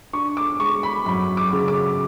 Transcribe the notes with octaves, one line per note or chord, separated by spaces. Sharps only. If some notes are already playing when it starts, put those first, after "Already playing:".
D4 C#6
D6
G#3 C#6
B5
F#2 B5
D6
C#3
D6